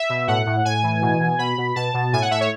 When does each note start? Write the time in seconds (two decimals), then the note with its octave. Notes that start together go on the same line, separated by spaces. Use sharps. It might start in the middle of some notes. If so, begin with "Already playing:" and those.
Already playing: E5
0.10 B2
0.28 A2 F#5
0.46 A2
0.65 A2 G#5
0.83 E3
1.02 B2
1.20 B2
1.39 B2 B5
1.58 B2
1.76 B2 A5
1.94 B2
2.13 A2 G#5
2.22 F#5
2.31 A2 E5
2.40 C#5